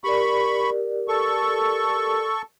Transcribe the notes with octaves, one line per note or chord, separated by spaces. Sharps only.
G4 A#4 D5 B5 C#6
A4 C#6